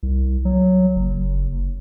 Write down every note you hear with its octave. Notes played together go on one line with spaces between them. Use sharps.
C2
F#3
F#1